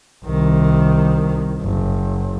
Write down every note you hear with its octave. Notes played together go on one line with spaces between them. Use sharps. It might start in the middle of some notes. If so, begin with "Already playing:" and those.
C2 D#3
F#1